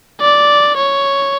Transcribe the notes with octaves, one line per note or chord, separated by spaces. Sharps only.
D5
C#5